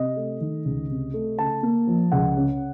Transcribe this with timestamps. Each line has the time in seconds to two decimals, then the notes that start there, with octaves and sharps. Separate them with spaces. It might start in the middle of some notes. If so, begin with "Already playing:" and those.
Already playing: C3 D#5
0.16 A3
0.41 D#3
0.65 C#2
0.90 C3
1.14 A3
1.39 C#3 A5
1.63 A#3
1.87 F3
2.12 C#2 F#5
2.37 C#3